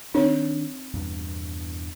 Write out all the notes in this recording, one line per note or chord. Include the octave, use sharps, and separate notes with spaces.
D#3 C4 D4 D#4 C#5
E2 G2 B2